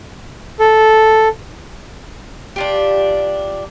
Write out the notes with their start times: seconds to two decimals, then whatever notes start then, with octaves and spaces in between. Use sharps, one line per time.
0.59 A4
2.56 D4 F4 G4